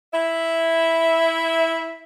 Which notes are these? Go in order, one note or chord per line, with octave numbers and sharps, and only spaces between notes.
E4 E5